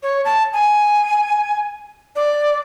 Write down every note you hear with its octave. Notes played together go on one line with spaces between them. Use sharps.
C#5
A5
G#5
D5